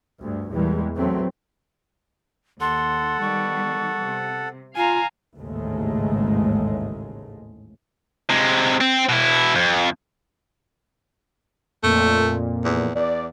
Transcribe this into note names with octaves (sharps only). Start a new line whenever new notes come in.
D2 G2
E2 A#2 E3 G3 G#3
A#1 E2 F#3 A3 B3 C4
D#2 A4 F#5 C6
D#3 G3 B3 C#6
C3
F4 F5 G#5 A#5
A1 D#2 G#2 C#3 G#3 A3
C3 G#3
C4
B2 E4
F2
F2 A#2 A3
E2
E2 D5